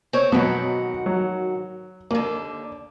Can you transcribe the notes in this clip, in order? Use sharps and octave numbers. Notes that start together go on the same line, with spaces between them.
C4 C#5
G#2 B2 D#3 F#3 B3 F#4
F#3
D#2 D3 A#3